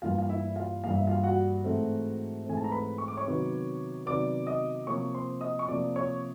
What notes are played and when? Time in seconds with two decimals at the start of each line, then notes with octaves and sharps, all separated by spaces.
0.02 G2 E3 G3 A#3 F4 F5
0.18 F5
0.29 E4 E5
0.56 F4 F5
0.84 G2 E3 G3 A#3 F5
0.95 E5
1.07 F4 F5
1.23 F#4 F#5
1.64 G#2 E3 A3 C4
2.45 G#2 E3 A3 C4 G#5
2.57 A5
2.64 A#5
2.71 B4 B5
2.98 C#6
3.08 D6
3.17 C#5 C#6
3.26 C3 D#3 F#3 B3
4.06 C3 D#3 F#3 B3 D5 D6
4.46 D#5 D#6
4.87 C3 F3 A#3 C#5 C#6
5.14 C5 C6
5.41 D#5 D#6
5.59 C#6
5.68 C3 F3 A#3 D5 D6
5.96 C#5 C#6